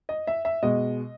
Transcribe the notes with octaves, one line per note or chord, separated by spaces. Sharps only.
D#5
E5
E5
B2 G#3 D#5